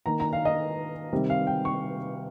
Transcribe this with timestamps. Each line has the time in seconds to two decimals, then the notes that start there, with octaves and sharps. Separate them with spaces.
0.06 D#3 A#3 A#5
0.20 A#5
0.33 F5
0.45 D#5
1.13 C3 D#3 G3 C4
1.30 F5
1.47 G5
1.65 C#6